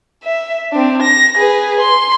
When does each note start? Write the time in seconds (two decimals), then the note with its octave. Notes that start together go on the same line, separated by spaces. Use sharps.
0.24 E5
0.72 C4 D4
1.03 A#6
1.36 G#4 B4
1.80 C6